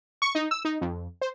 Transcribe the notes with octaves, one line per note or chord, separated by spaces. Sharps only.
C#6
D#4
E6
D#4
F2
C5